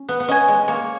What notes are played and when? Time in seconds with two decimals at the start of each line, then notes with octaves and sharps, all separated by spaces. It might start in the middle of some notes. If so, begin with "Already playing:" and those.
Already playing: C#4
0.09 B3
0.20 B3
0.28 C#4 D#5 G#5
0.48 G#3
0.68 A#3 C#5